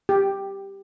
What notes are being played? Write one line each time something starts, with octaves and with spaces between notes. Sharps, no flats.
G4